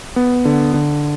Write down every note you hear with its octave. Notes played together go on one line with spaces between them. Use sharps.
B3
D3
D3